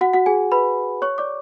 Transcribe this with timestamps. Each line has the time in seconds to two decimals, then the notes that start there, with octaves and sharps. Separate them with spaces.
0.01 F#4 F#5
0.14 F#4 F#5
0.26 G#4 G#5
0.52 B4 B5
1.02 C#5 C#6
1.18 D5 D6